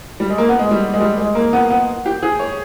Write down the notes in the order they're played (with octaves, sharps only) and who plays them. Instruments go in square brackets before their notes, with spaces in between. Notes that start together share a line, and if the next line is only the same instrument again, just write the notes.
[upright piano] G3
G#3
A#3
B3
G#3
G3
G#3
G3
G#3
A#3
B3
B3
G4
G#4
C#5